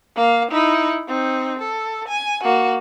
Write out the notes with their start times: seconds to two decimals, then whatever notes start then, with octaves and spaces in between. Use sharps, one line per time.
0.16 A#3 F5
0.51 D#4 E4
1.08 C4 D#4
1.59 A4
2.08 G#5
2.43 A#3 F#4